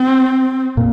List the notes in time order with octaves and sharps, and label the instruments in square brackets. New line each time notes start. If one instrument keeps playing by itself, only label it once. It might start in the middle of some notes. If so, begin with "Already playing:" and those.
Already playing: [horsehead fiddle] C4
[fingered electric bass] A#2